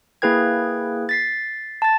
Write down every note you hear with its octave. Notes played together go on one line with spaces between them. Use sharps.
A#3 E4 G#4 B4 G5 G#6
A6 B6 C7
A5 A6